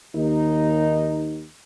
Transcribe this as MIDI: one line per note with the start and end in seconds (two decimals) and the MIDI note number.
0.15 1.43 39
0.15 1.43 63